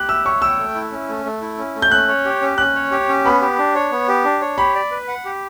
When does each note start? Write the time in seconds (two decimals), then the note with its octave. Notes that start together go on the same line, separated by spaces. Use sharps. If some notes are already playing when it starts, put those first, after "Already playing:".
Already playing: G4 F#6
0.08 E5 E6
0.25 C#5 C#6
0.42 G5 E6
0.59 A3
0.75 E4
0.92 C#4
1.08 A3
1.25 A3
1.41 E4
1.58 C#4
1.75 A3
1.82 G6
1.91 C#4 F#6
2.08 C#5
2.25 G4
2.42 C#4
2.58 C#4 F#6
2.75 C#5
2.91 G4
3.09 C#4
3.25 B3 B5
3.41 G4
3.58 D4
3.75 C#5
3.92 B3
4.08 G4
4.25 D4
4.41 C#5
4.58 G4 B5
4.75 D5
4.91 B4
5.08 F#5
5.25 G4